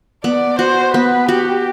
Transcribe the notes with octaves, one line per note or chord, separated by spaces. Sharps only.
B3 D5
F#4 C5
B3 B4
F#4 G4